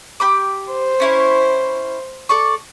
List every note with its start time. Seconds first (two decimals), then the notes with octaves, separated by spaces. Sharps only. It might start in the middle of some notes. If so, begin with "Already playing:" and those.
0.20 G4 B5 D6
0.71 C5
1.00 C#4 E4 C#5
2.29 A4 D5 C#6